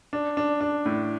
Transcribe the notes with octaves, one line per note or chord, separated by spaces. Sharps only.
D4
D4
D4
A2